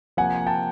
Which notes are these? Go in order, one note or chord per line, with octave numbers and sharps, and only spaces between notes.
C3 F3 A#3 F#5 G#5
G5 A5